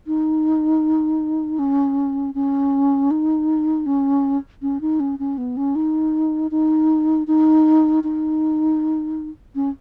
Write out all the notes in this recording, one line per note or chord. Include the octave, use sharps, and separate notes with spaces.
D#4
C#4
C#4
D#4
C#4
C#4
D#4
C#4
C#4
B3
C#4
D#4
D#4
D#4
D#4
C#4